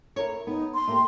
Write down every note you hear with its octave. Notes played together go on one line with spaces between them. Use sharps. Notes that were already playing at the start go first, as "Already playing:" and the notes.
E4 A#4 C#5
B3 D#4
C6
A3 A#3 G4